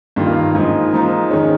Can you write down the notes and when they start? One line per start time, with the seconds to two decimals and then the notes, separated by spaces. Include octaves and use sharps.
0.16 G2 D#3 A#3 F4
0.55 G#2 F3 A#3 D#4
0.93 G#2 F3 A#3 D#4
1.31 D#3 G#3 C#4